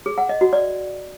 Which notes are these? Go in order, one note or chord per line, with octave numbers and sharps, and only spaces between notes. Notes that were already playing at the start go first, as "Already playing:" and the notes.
G#4
F#5
D#5
F#4
D5